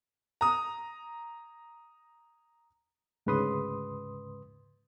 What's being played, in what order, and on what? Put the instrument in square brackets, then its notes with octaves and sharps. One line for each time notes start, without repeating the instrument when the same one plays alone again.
[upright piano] A#5 D#6
[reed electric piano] D2 G#2 C#3 B4 C6 D#6